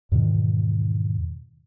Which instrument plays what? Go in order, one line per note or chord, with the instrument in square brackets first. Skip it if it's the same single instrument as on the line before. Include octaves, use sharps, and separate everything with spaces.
[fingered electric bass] E2 G#2 B2 D#3